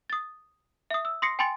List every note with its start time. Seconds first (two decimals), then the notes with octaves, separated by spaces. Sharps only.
0.10 D#6 A6
0.91 E5 D#6
1.05 E6
1.22 C6 D#6 A#6 C7 C#7
1.39 G5 G#5 B5 C6 A6 C#7